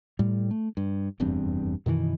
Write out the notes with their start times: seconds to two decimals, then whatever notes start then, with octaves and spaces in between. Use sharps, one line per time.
0.19 A2 G3
0.51 A3
0.77 G2
1.20 F1 E2 G2 C4
1.86 F#2 B2 D#3 E3